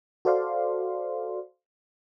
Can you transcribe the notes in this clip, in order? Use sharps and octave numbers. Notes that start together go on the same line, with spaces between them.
F#4 A4 C5 D5 F5 C6